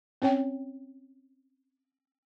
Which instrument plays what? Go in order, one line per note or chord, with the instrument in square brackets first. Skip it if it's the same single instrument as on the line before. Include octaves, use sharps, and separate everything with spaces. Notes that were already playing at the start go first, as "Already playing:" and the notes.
[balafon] C4 C#4 C#5 G5